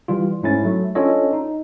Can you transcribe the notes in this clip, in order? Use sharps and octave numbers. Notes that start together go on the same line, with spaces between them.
E3 G3 F4
G#2 A3 C#4 E4 A6
F#3 A3
C#4 D4 F4 A4 C#5 D#5
D#4